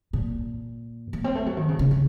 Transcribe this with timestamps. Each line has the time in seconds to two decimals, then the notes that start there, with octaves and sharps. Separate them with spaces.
0.13 A#2
1.13 A#3
1.24 C4
1.35 A3
1.46 F#3
1.57 D#3
1.69 C#3
1.79 C#3
1.91 C#3